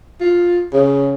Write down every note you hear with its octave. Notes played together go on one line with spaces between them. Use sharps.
F4
C#3